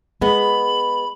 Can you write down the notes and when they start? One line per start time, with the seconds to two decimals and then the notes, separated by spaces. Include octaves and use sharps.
0.21 G#3 B3 B5